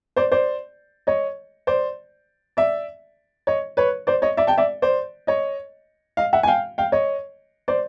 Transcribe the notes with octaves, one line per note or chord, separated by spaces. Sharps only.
C5 D5
C5 D5
C#5 D#5
C5 D5
D5 E5
C#5 D#5
B4 C#5
C5 D5
C#5 D#5
D5 E5
G5 A5
D5 E5
C5 D5
C#5 D#5
D#5 F5
E5 F#5
G#5
F5 G5
F5 G5
C#5 D#5
C5 D5